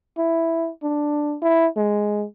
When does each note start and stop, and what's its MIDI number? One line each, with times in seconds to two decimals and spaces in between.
0.18 0.69 64
0.83 1.36 62
1.42 1.66 64
1.76 2.25 56